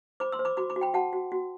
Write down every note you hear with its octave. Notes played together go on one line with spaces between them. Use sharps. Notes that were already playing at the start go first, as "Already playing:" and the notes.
C5 B5 D6
C6 E6
C5
B5 D6
F#4 B5 D6
B5 D6
F#4
G5 B5
F#4 F#5 A5
F#4
F#4